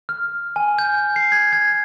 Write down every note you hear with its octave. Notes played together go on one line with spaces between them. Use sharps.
F6
G#5
G6
C7
G#6
G#6